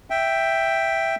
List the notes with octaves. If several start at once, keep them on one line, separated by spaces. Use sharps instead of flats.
E5 G5